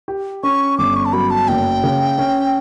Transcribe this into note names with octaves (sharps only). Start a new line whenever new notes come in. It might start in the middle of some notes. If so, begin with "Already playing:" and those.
G4
C#4 C#6
G1 D6
C#6
A5
F#3 B5
A5
F#1 G5
C#3
C#4